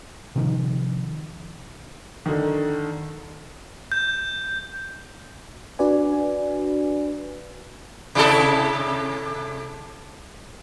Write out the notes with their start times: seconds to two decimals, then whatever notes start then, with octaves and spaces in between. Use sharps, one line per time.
0.36 C3 D#3 F3
2.26 D3 D#3
3.92 G6
5.79 D4 F#4 B4 D5 G#5
8.15 C3 E4 A4